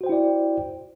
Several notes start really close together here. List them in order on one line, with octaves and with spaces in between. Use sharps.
F#4 C5 G5 E4 D5